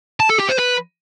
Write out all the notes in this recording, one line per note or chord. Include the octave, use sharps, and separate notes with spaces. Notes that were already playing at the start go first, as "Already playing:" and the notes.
A5
A4
G4
C5
B4